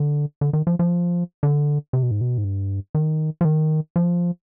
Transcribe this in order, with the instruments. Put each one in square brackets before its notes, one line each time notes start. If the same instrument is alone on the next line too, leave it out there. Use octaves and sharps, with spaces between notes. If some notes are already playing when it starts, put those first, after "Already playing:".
Already playing: [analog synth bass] D3
D3
D#3
F3
F3
D3
C3
B2
G#2
B2
G#2
G2
D#3
F3
D#3
F3